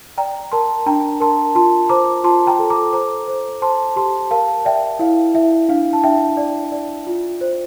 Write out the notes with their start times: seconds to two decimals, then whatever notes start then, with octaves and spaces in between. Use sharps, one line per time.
0.18 D5 G5 A#5
0.52 A#4 A5 C6
0.86 D4 G5 A#5
1.20 A#4 A5 C6
1.55 F4 A5 C6
1.89 C5 A#5 D6
2.24 F4 A5 C6
2.47 G5 A#5
2.59 A4
2.70 A#5 D6
2.93 C5 A#5 D6
3.28 C5
3.62 C5 A5 C6
3.96 G4 A5 C6
4.31 A#4 F5 A5
4.65 D5 E5 G5
4.99 E4 F5
5.34 E4 E5
5.68 D4 F5
5.93 A5
6.03 D4 E5 G5
6.37 D5
6.72 D5
7.07 F4
7.41 C5